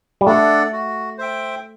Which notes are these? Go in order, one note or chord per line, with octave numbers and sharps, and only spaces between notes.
G3
A3 D4 A4 D5 F#5
F#4
C5 E5 G5